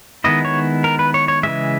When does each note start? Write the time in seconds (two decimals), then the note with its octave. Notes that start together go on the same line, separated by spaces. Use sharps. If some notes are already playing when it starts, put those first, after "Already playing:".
0.24 D#3 G#3 B3 E4 D#5
0.45 C#5
0.84 A#4
0.99 B4
1.14 C#5
1.28 C#5
1.43 C#3 E3 G#3 E5